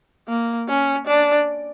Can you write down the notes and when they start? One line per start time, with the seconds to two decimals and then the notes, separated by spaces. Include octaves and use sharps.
0.29 A#3
0.68 C#4
1.07 D4